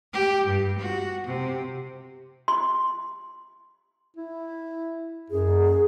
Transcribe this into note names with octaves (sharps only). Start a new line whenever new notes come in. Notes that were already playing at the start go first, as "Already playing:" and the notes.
G4
G2
F#4
C3
C6
E4
F#2 G#4